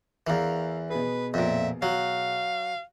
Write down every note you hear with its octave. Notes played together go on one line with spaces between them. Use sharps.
E2 E3 A#4 F5 A#5
B2 G#4 B4
F2 A#2 E5
F#3 F5